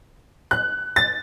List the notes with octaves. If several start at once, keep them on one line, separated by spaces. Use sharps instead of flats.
F#6
A6